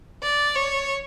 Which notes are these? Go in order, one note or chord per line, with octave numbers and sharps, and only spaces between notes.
D5
C#5